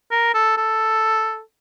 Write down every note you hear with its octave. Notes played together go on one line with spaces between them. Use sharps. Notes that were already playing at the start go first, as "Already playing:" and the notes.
A#4
A4
A4